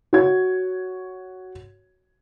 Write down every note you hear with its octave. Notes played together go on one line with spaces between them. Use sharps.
F#4 C#5 G#6